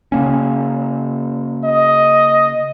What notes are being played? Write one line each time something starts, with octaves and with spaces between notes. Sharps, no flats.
C#3 A#3 C#4
D#5